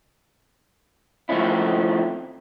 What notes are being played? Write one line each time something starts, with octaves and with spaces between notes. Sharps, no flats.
D#3 F3 A3 C4 C#4 E4